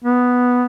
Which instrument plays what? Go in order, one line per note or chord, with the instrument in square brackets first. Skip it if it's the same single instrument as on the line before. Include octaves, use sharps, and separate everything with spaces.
[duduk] B3